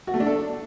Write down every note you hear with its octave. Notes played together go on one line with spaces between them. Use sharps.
F#4
A3
D4
A4